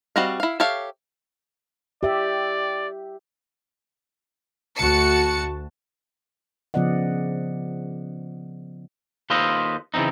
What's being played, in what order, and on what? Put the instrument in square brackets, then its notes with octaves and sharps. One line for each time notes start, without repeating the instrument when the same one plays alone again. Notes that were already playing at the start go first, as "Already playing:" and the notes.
[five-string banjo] G3 C4 F#4 D#5 F5
E4 F5
G4 A4 C#5 E5 F5
[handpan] G4 E5 [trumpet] D5
[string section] D2 F#4 A5 C#7
[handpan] C#3 F3 B3 D5 D#5 F#5
[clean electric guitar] D#2 F4 A4 B4 C5 D#5
C#3 E3 F3 C4 D#4